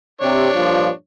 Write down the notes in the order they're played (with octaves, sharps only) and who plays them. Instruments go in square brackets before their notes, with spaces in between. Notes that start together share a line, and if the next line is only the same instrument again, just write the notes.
[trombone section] C3 [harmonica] D4 C#5
[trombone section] G2 A#2 F3